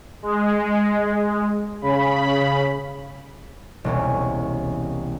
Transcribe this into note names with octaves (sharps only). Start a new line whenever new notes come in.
G#3
C#3 B5
E1 C2 C#4